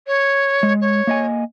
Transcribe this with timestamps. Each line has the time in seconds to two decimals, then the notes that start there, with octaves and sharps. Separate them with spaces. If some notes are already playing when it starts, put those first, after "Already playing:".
0.07 C#5
0.63 G#3
0.81 C#5
1.07 A#3 D#5 G#5